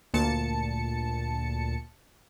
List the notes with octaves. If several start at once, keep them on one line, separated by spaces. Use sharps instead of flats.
D2 A#2 A5 C#7